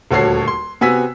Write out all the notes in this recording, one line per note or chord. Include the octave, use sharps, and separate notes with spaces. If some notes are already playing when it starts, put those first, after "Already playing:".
D#1 D2 F#4 A4 C#5 C7
C6
C3 B3 F#4 G#5 E6 B6